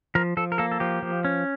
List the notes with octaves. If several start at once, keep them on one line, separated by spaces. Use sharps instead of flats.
F3 A#4
F3 A4
A#4
A#3 A4
A4
F3 G4
F3
C#4